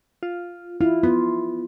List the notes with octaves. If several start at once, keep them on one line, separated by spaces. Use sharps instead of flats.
F4
E4 F4
B3 F4